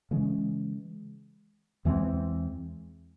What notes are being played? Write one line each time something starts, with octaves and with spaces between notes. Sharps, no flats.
C#3 E3 G#3 C#4
E2 E3 G#3 C4